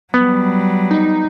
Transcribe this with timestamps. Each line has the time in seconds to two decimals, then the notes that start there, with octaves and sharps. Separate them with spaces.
0.14 F#3 G3 B3
0.91 D#4